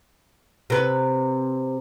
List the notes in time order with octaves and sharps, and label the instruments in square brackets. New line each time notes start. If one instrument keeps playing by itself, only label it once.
[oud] C3 B4